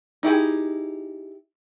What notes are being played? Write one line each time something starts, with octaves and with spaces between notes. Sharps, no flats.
D#4 E4 G4 G#4